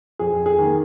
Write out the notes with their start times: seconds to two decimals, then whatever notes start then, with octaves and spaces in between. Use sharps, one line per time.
0.19 F2 G#4
0.46 G#4
0.58 D#3 A#3